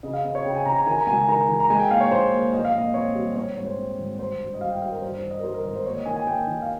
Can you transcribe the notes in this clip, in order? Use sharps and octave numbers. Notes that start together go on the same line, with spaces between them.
C#3 D#5
F5
C4 D#5
C#5
C#3 G5
G#5
C#3 A#5
A#5
D#3 G#5
A#5
C#2 G#5
G#5
D#3 A#5
D#3
A#5
G#3 G#5
G5
A#2 F5
C#5
A#1 C5
A#2
A#1 D#5
F5
A#2 D#5
C4 C#5
G3
C4 C#5
G#2 C#5
C5
C4
G#1
G2 C5
G2
D#5
G3 F5
G5
G3 F5
A#4
G2 C5
C5
D#3
D#5
A#4
G3 C5
A#4
G#1 C5
C5
A#3 C#5
D#5
D#3 G#5
G#5
A#3 G5
D#3
F5